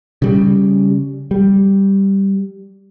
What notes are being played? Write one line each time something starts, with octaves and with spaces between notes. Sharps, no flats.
C#3 G3
G3